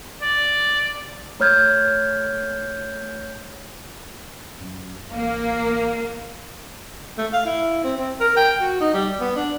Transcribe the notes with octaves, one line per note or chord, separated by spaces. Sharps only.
D5
A3 C#5 F6 G6 G#6
F#2
A1 A#3
A3
F5
E4
C4
C4
A#4
G5
F#4
D#4
G3
B3
D4